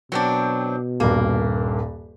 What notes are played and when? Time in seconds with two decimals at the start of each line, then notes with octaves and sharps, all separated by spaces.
0.12 B2 F#3 C4 D4
1.00 D#1 G2 A#3